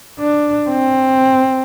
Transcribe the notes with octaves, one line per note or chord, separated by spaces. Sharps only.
D4
C4